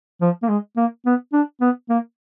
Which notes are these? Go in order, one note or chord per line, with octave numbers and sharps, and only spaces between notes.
F3
A#3
G#3
A#3
B3
D4
B3
A#3